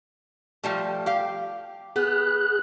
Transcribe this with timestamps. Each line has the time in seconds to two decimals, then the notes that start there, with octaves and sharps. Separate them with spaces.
0.64 F3 G3 A3
1.06 G4 F5
1.96 B3 G#4 F#6